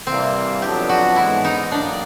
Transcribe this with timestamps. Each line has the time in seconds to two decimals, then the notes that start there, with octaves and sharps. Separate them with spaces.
0.07 C3 E3 G3 A#3 C4
0.62 F2 D3 F#3 B3 D4 G4
0.89 F#4
1.16 G#2 E3 G#3 B3 E4
1.44 D#4
1.72 A2 F#3 A#3 D4